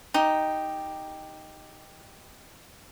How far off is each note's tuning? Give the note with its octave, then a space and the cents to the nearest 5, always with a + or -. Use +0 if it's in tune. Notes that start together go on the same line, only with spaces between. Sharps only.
D#4 +0 G4 +5